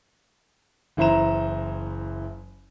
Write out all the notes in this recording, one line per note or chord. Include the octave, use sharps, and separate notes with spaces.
F#1 E3 E4 C5 A#5 E7